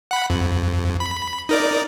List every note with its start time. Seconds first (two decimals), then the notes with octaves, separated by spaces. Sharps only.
0.11 F#5 B5
0.30 F2
1.00 B5
1.49 D#4 A#4 D5